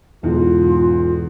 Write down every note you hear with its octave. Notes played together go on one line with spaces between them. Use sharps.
B1 E2 G#2 F4